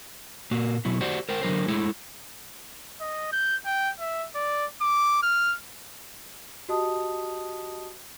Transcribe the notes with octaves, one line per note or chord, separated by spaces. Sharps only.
A#2 A#3 F#4
B2 F#3 E4
F#4 G4 C5 D5 F#5
A#4 C5 G5
D3 F#3 A#4 C5
G#3 A3 E4 G#4 A4
D#5
G6
G5
E5
D5
D6
F6
F#4 G4 D#5 A5 D#6